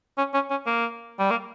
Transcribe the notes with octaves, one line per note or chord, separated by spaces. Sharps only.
C#4
C#4
C#4
A#3
G3
A#3